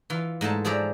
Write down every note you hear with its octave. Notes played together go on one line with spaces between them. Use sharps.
E3 F4
G#2 G#3 A3 A4 A5
F3 G#4 C5 D5 E5 A#5